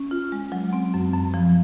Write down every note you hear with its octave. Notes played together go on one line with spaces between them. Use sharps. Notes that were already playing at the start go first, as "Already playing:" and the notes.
Already playing: C#4
F4
G#3
F#3
C4
F#2
F#2
F3